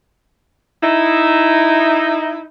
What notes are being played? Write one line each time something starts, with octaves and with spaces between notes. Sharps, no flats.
D#4 E4